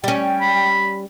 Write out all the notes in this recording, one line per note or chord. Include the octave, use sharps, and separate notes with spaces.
G3 C#4 G5
B5